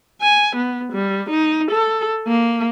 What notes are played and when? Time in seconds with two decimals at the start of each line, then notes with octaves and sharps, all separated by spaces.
0.22 G#5
0.56 B3
0.92 G3
1.30 D#4
1.71 A4
2.27 A#3